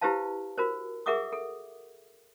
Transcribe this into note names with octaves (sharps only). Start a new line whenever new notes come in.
E4 G4 B4 C5 F5 A5
F#4 A#4 C5
G#4 A#4 E5 F#5 D6 D#6
A4